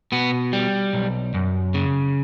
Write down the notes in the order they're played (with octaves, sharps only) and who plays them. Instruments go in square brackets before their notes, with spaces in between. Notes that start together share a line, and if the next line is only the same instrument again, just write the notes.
[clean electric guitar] B2 B3
G3
B1
F#2
C#3